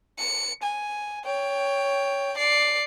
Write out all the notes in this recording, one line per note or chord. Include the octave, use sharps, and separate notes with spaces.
C#7
G#5
C#5 G5
D5 C7